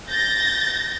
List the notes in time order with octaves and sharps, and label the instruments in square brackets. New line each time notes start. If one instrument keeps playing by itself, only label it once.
[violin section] G6 A6 A#6